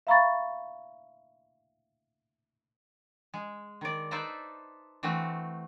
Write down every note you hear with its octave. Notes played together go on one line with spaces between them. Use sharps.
E5 F5 A#5 B5 C#6 A6
G#3
D#3 D5
D#4 A4 B4 C5 D5 E5
E3 A3 C4 F#4